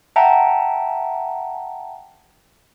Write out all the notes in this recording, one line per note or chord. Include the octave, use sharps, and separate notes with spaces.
E5 F#5 G5 A5 A#5